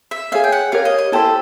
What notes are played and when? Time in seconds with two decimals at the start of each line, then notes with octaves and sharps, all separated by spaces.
0.11 E5
0.32 G#4 C#5 E5 F5
0.44 G5
0.52 F#5
0.72 G4 A#4 C#5 F5
0.85 D#5
0.99 D#5
1.12 E4 G4 A4 C5